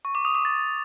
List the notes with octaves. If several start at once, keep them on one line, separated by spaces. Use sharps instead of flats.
C#6
D6
D#6
D6
A6